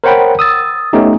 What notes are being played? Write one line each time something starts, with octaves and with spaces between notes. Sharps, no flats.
A#4 C5 C#5 F#5 G5 B5
D#6 E6 A6
A3 B3 C#4 D#4 G4